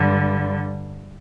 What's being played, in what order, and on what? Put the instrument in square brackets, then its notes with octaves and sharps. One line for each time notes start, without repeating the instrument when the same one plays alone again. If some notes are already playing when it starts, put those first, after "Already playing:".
Already playing: [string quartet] G2 D3 G3